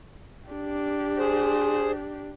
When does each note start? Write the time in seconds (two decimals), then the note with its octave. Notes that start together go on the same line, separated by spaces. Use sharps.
0.48 D4 G4
1.18 G#4 C5